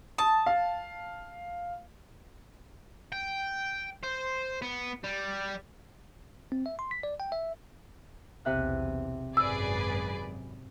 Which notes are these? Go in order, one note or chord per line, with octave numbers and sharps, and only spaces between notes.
A5 D#6
F5
G5
C5
B3
G3
C4
E5
C6
B6
D5
G5
E5
B1 E2 C3 E5 F#6
G#1 F#2 G#4 B4 D5 E6